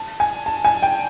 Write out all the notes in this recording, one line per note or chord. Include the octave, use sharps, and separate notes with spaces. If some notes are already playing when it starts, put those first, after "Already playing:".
Already playing: A5
G#5
A5
G#5
G5